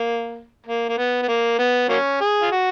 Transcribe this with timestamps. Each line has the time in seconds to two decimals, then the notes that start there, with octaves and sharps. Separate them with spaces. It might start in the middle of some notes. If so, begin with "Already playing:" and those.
Already playing: A#3
0.66 A#3
0.89 A#3
0.98 B3
1.22 B3
1.28 A#3
1.59 B3
1.89 F#3 A#3 C#4
2.20 G#4
2.42 F4
2.51 F#4